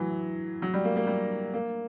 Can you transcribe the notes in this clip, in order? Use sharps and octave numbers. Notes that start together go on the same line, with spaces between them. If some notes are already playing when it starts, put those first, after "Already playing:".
Already playing: E3 F#3
F#3
G3
A#3
A#3
G3
A#3